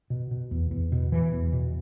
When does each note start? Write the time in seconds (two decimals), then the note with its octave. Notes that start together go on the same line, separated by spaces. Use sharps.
0.10 B2
0.31 B2
0.51 E2
0.71 E2
0.92 B2
1.12 B2 E3
1.33 E2
1.53 B2